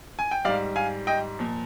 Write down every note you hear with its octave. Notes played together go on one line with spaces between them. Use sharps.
G#5
G5
G#2 G3 D5 F5
F5 G#5
D#5 G5
A#2 F3